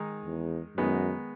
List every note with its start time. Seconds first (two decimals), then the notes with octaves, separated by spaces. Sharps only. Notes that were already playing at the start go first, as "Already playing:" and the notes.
Already playing: D#3 G#3 D#4
0.25 E2
0.77 F#2 D#3 G#3 B3 D#4